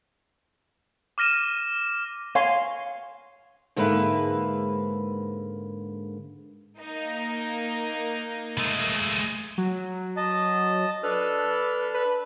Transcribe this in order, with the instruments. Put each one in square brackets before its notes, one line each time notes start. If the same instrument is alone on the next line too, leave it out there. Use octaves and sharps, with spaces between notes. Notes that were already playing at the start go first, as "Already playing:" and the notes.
[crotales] D6 F6 A#6 D#7 E7
[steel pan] C#5 G#5 C6 [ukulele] F5
[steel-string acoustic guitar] G#2 D3 G#3 A#3 B4 E5
[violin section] A#3 D#4
[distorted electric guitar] G#3 A3
[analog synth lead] F#3
[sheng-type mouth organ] D#5 A5
[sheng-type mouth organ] D4 A4 F6 [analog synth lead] B4
[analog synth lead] B4